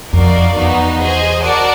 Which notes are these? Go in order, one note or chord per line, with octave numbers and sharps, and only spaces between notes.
F2 D#4 F#4 A#4 D5 F5
E2 B3 D#4 F#4
G#4 C5 D#5 G#5
F#4 A#4 D5 F#5 A5